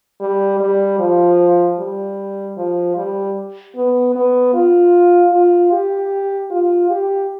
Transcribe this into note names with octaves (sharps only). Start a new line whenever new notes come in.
G3
G3
F3
G3
F3
G3
B3
B3
F4
F4
G4
F4
G4